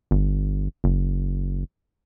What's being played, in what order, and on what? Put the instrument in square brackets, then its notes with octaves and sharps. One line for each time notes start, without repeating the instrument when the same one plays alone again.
[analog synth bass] G1
F#1